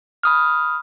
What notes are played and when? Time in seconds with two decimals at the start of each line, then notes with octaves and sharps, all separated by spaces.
0.23 B5 D#6 F6